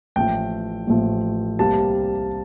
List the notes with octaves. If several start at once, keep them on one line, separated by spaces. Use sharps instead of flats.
A1 A2 F3 A3 G5
A1 A2 F3 A3
C2 C3 G3 A#3 A5